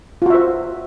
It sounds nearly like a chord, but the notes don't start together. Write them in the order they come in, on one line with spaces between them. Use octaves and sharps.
F4 F#4 E5 C5